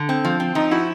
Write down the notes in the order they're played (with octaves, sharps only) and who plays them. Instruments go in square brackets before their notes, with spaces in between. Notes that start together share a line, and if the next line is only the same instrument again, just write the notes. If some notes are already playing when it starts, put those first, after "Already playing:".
Already playing: [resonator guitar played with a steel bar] D3
C4
F3
C4
[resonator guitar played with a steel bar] F3 [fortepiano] D#4
[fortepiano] E4 [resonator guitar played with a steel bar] F#4